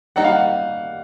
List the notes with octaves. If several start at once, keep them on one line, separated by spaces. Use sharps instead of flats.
D#3 G3 A#3 D#4 G4 F#5
F5
F#5